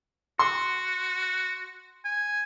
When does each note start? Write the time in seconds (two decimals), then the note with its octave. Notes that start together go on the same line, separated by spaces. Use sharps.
0.39 F#4 C6
2.05 G#5